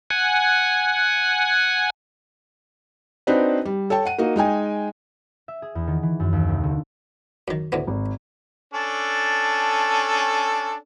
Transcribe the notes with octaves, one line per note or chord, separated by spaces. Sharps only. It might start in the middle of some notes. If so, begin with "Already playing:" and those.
F#5 G#5
C4 D4 D#4 F#4 B4 C5
G3
A4 C#5 G5 A5
F#5 D#7
A#3 D#4 F#4 F5
G#3 D#4 G5 G#5
E5
G#4
E2
D#3
E3
F#2
D#2
C2
D3
F#2 D#3
D2 A2 B3
G#1
C#4 D4 A4